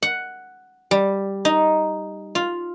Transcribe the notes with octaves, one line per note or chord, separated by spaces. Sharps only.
F#5
G3
D#4
F4